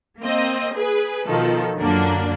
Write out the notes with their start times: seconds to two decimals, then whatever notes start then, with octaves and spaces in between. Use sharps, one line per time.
0.20 A#3 C4 D#5
0.75 G#4 B4
1.26 B2 D#3 F3 A4
1.78 F#2 D3 A#3 D4